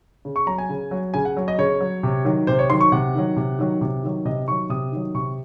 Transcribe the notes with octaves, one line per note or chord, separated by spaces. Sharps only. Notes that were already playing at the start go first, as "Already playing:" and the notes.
C#3
C#6
F#3 A#5
G#5
C#3
F#3
C#3 G#5
F#5
F#3
D#5
C#3 C#5
F#3
C3
D#3 F#3
C3 C5
C#5
D#3 F#3 C6
C#6
C3 F#5
D#3 F#3
C3
D#3 F#3
C3
D#3 F#3
C3 D#5
D#3 F#3 C#6
C3 D#6
D#3 F#3
C3 C#6